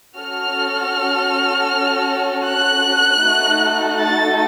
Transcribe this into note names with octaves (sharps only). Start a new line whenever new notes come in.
C#4 F#4 A4 F6
F#6
A3 D#4 F#4 A4
A6